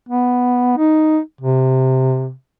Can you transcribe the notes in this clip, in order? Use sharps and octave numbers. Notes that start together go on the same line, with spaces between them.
B3
D#4
C3